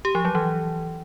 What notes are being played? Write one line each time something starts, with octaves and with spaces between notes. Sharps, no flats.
G4
F3
F#3
E3